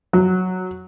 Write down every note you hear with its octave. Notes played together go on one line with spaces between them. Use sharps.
F#3